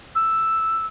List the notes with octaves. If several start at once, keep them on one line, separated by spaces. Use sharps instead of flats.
E6